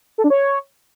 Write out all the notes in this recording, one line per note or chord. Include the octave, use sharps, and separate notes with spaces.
A4
D4
C#5